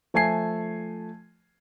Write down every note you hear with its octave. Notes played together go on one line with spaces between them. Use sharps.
F3 A3 G#5 A5 G#6 C7